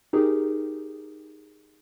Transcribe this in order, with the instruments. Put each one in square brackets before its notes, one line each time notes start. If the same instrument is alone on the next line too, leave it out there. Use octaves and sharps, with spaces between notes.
[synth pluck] D#4 G4 G#4 A#4